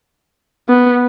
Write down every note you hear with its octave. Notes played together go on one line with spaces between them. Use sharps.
B3